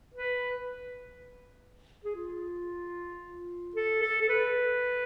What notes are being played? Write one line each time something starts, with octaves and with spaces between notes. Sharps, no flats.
B4
G#4
F4
A4
A4
A4
B4